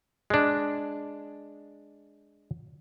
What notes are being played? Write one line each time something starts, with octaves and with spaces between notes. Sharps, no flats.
G#3 D4